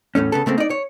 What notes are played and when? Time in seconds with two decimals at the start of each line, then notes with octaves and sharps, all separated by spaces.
0.15 E2 A2 A3 C#4
0.32 C#3 B3 A4
0.46 C#3 A3 A#3 C4
0.58 D#4 D5
0.70 C#5